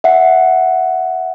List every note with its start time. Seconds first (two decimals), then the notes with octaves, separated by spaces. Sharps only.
0.04 E5 F#5